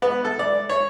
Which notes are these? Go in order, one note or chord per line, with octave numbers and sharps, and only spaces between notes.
B3
A4
D5
C#5